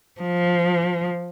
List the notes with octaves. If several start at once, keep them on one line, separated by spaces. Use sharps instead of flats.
F3